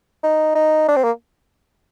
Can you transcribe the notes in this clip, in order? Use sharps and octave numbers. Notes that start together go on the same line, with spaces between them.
D#4
D#4
D4
C4
A#3